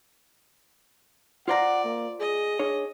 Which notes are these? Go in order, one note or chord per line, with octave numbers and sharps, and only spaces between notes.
F4 C5 D5 F#5 A#5
A#3
G#4 D#5
D4 G#4 C#5